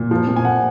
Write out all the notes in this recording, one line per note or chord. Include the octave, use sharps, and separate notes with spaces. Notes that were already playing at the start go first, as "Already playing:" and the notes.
Already playing: A#2
F3
A#2
G#5
A#2 F#5